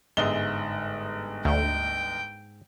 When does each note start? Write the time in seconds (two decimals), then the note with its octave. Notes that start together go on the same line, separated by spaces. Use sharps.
0.17 G1 G#2 G#4 D#5 E5 G7
1.45 D2 G5